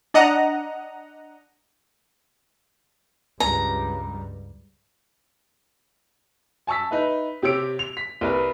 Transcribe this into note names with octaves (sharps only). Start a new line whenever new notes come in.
D4 D#5 F#5 A#5
C#2 G2 G3 A#5
G#5 A5 C#6 E6 B6
D#4 B4 E5
C3 G4 C#5 E6 D7
F7
B6
C2 A#4 B4